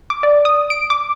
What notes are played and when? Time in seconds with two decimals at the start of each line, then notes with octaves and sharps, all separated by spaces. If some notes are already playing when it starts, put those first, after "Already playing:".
0.10 D6
0.23 D5
0.45 D#6
0.70 D7
0.90 D6